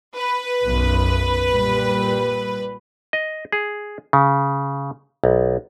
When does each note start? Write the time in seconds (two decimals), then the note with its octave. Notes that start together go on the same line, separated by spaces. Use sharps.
0.16 B4
0.64 B1 F#2
1.51 A#2 G3
3.13 D#5
3.52 G#4
4.13 C#3
5.24 B1